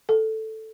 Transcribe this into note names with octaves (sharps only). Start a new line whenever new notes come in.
A4